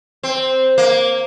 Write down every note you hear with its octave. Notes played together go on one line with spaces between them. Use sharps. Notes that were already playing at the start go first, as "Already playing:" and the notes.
C4
A#3